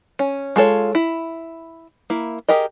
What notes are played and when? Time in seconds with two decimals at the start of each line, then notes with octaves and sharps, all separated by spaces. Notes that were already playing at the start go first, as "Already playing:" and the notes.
0.19 C#4
0.56 G#3 F4 A4 C#5
0.95 E4
2.10 A#3 E4
2.49 G4 G#4 A#4 D#5